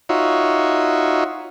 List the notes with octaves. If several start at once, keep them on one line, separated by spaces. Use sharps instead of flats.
D#4 F4 F#4 C#5 E5